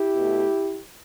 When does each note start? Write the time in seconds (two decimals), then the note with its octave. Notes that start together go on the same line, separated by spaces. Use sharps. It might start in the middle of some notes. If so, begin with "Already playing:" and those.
Already playing: E4 G4
0.15 B2 A3